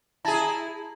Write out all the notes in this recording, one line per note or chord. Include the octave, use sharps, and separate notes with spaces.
E4 G#4 A5 A#5